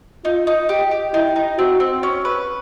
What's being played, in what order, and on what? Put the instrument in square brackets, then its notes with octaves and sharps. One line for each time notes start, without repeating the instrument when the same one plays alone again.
[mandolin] D#4 [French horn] F4
[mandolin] D#4
G4
G4
[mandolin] D#4 [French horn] E4
[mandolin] D#4
[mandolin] C4 [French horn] F#4
[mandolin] C4
C#4
B4